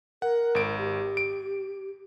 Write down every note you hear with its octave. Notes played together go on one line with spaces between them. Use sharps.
A#4 F#5
G#1 D7
G4
D7